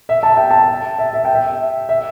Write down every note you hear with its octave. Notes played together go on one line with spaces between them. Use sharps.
E5
A5
G5
A5
E5
E5
G5
E5
E5